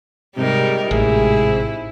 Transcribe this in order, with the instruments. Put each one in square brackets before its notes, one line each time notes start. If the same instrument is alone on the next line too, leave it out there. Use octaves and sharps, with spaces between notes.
[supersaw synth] G#2 C3 [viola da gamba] G3 D#4 A#4
[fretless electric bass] A1 [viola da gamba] E4 [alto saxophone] G#4